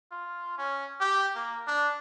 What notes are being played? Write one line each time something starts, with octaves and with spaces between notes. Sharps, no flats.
F4
C#4
G4
A#3
D4